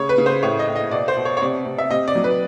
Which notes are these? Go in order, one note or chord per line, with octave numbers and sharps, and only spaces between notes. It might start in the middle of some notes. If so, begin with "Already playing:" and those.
Already playing: C#3 C#5
B4
C#3
C5
A2 C#5
D#5
A2
D#5
B2 D5
C5
B2
C#5
C#5
C3 D5
C3
E5
C3 D#5
D5
F#3
B4